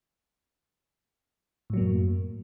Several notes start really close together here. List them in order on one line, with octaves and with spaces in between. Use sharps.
A2 F#3 A#3 F#2